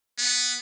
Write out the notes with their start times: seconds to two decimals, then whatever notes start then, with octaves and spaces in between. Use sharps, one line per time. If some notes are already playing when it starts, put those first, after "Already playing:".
0.18 B3